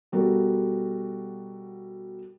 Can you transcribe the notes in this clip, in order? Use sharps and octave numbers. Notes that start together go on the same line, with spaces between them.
B2 G3 F#4 A4 A#4